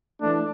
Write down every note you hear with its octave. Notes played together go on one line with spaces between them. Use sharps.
E3 A3 D4